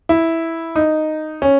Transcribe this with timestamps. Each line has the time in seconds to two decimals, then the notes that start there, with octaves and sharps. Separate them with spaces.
0.09 E4
0.76 D#4
1.42 C#4